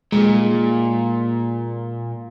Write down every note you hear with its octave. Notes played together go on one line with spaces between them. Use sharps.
A#2 G#3